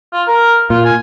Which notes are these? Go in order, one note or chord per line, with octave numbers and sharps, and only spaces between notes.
F4
A#4
A#2 F4
G#5